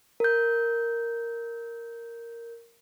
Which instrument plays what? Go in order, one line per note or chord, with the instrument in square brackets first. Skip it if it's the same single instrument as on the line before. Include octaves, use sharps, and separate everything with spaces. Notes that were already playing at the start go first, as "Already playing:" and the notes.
[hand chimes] A#4 G6